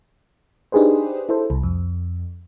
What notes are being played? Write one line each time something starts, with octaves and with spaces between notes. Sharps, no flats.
D4 D#4 G4 G#4 B4 C5
E4 A4 C5
C2
F2